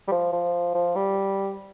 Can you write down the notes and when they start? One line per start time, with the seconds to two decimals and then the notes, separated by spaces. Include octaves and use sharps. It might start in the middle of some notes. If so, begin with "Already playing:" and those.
0.08 G3
0.12 F3
0.33 F3
0.75 F3
0.96 G3